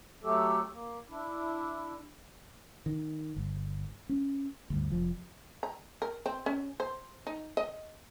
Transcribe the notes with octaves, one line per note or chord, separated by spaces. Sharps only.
F#3 A3 G4 A4
A#3
D4 E4
D#3
G1
C#4
D2 G2
F1 F3
A#5
A#4
C4
C#4
C5
D#4
D#5